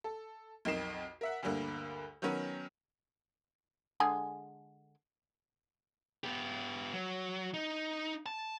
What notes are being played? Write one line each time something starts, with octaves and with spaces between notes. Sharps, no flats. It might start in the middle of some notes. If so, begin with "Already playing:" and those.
A4
B1 F2 D#4 A#4 C7 E7
A#4 E5 F#5
D2 G2 D3 A#3
D#3 F#3 B3 C#4 A#4
D3 G#3 G#4
B3 G4
F#3
D#4
A5